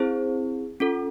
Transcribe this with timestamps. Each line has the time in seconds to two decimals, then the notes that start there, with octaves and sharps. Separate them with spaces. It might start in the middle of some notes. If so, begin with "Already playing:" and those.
Already playing: C4 E4 G#4 C5
0.80 C#4 F4 A4